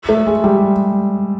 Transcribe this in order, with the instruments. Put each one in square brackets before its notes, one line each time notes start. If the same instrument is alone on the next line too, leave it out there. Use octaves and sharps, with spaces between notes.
[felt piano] A3
G#3
G3